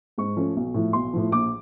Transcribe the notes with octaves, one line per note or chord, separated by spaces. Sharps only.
G#2 C#6
F3 A3 C#4
B1
A2 F3
B1 C6
A2 F3
A#1 D6